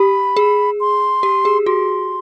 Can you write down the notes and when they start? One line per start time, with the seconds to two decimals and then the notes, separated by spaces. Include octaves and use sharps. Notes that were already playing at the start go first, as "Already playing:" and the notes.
Already playing: G4 B5
0.37 G#4
0.80 C6
1.23 G4
1.45 G#4
1.66 F#4 C6